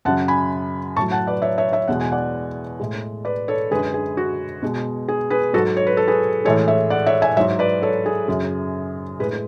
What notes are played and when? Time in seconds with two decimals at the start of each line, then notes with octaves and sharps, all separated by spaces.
0.05 F#2 C#3 F#3 F#5 A5
0.28 G#5 B5
0.96 A2 A5 C#6
1.02 F#3
1.11 F#5 A5
1.27 B4 D5
1.42 C#5 E5
1.58 C#5 E5
1.72 C#5 E5
1.88 E2 B2 G#3 F#5
2.01 G#5
2.12 D5 F#5
2.80 A2 G#3
3.25 B4 D5
3.48 A4 C#5
3.71 F#2 D3 G#3 G#4 B4
3.94 G#4
4.17 F#4
4.63 B2 G#3
5.08 G#4
5.30 G#4 B4
5.53 G#2 F#3 F#4 A4
5.77 C#5
5.87 B4
5.97 A4
6.08 G#4 B4
6.45 A2 E3 G#3 A4 C#5
6.68 C#5 E5
6.90 D5 F#5
7.07 C#5 E5
7.22 E5 G#5
7.37 G#2 F#3 C#5 E5
7.59 B4 D5
7.82 A4 C#5
8.06 G#4
8.28 F#2 C#3 F#3
9.19 A2 G#3 G#4 B4